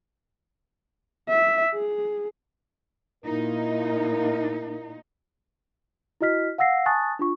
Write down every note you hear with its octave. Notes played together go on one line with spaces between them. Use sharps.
E5
G#4
A#2 A#3 D#4 E4 A#4
E4 F#4 D#5 F6 B6
F5 F#5 E6 A#6 C7
G#5 A5 C#6 D#6 F#6 A6
D4 F4 C#6